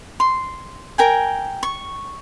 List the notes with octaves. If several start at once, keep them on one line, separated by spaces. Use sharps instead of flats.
C6
A#4 G5 G#5
C#6